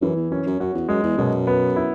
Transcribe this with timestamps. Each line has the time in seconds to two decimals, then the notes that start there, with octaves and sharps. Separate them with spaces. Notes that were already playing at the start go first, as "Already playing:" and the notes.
0.02 F#2 E3
0.16 E2
0.31 F#2 C#4
0.46 F#2
0.60 F#2 F#4
0.74 E2
0.89 F#2 G#3
1.04 E2
1.17 F#2 B2
1.47 B3
1.76 E4